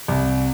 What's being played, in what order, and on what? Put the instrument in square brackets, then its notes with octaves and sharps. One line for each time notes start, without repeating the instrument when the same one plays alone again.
[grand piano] C2